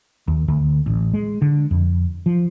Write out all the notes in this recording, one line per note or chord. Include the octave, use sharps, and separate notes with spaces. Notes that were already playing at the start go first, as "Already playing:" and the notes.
D#2
D2
A1
G#3
D3
F2
F3